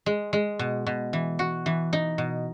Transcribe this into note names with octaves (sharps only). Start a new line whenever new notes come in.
G#3
G#3
B2
B2
E3
F#4
E3
D#4
B2